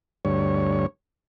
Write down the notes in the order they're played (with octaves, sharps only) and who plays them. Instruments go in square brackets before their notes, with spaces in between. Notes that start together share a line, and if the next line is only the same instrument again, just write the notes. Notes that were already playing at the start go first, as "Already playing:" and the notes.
[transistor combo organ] D2 G2 C#5